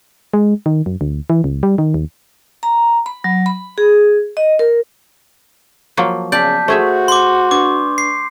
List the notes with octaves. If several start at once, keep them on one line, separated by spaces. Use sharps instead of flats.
G#3
D#3
F#2
D2
E3
C#2
G3
D#3
D#2
A#5
B5
F#3
B5
G#4
D#5
A#4
F3 F#3 A#3
C#3 B3 D5 A5 G6 B6
A3 F#4 G#4 C5 E5 C#6
C6 D6
D4 B4 C#6 D6
C7